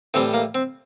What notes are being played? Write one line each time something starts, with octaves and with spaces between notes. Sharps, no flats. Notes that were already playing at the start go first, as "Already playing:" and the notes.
A2 E3 G3 C4
A#3
C4